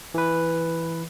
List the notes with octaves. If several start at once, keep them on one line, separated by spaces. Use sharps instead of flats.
E3 B4